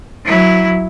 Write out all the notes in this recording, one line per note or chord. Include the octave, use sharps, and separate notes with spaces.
F#3 E4